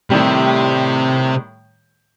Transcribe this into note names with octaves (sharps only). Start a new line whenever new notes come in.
A2 C3 D#3 G3